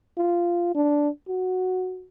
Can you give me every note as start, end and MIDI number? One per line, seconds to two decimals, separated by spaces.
0.17 0.72 65
0.75 1.09 62
1.28 2.07 66